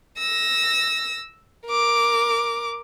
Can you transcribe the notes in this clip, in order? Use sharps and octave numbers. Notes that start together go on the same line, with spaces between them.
E6 A#6
A#4 D6